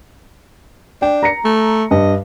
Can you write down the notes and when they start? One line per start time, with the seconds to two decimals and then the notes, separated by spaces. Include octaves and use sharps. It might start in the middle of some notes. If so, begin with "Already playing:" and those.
1.02 D4 G5
1.23 A#5 A#6 C#7
1.45 A3
1.91 G2 D#5